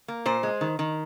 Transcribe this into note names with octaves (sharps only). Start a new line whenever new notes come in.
A#3
A#2 C5
G#3
D#3
D#3